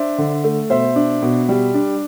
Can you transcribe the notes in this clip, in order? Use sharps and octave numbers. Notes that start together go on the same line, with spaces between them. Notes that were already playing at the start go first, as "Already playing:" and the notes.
Already playing: D4 C5 E5
D3
A3
B2 C5 E5
D4
B2
G3
D4